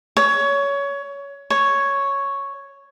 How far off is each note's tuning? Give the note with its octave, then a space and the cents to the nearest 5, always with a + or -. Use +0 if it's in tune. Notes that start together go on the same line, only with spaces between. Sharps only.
C#5 +20
C#5 +0